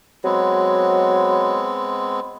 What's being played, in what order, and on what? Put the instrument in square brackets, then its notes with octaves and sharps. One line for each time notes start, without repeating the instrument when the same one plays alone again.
[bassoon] F#3 [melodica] G#3 B3 C4